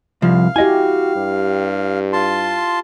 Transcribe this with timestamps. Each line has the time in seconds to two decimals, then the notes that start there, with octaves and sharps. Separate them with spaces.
0.22 C2 F3 F5
0.56 E4 F#4 G4 D#5 G#5
1.16 G2
2.13 F4 A5 C6